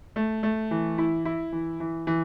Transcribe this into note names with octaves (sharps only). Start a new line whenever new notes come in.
A3
A3
E3
E4
E4
E3
E3
E3